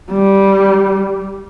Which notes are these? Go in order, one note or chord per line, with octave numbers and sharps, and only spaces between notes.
G3